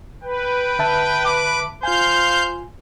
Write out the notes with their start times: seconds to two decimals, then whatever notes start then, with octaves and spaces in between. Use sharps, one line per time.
0.23 B4 G5
0.79 D3 E5 A5
1.25 D6
1.83 F4 C5 F5 G#5 G6